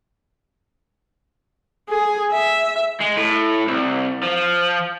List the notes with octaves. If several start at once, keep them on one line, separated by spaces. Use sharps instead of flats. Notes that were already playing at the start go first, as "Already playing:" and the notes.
G#4
E5
G#3
A2
C2
F3